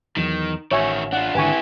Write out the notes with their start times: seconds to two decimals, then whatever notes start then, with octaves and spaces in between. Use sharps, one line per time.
0.17 E2 D#3 F#3
0.71 A1 D#3 F#4 C#5 E5 G#5
1.13 D4 F4 F#5
1.35 G#1 D3 E4 G4 B4 G#5 C#6